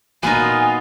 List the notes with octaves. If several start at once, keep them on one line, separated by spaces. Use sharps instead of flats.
A#2 A#3 B3 D#4 F4 F#4 G#5